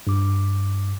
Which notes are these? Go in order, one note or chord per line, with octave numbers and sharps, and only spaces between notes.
G2 D6